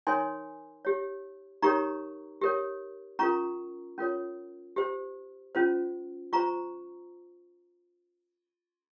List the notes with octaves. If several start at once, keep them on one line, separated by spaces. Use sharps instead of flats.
D#4 A#4 C#5 G#5 C6
G4 C#5
D#4 G4 A#4 C#5 A#5 C#6
G4 A#4 C#5
C#4 F4 A#4 A#5 C#6
C#4 F4 A#4 C#5
G4 C5
C#4 F4 C5
F4 C5 A#5 C#6